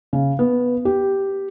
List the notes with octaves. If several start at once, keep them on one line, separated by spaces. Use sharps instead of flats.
C#3
B3
G4